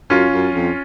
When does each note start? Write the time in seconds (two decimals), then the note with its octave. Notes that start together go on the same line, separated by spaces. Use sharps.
0.10 F#2 C#4 F4
0.33 F#2
0.54 F2